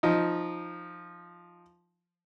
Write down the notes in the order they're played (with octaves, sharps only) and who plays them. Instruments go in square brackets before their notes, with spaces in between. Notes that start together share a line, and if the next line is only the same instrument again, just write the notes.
[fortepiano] F3 D#4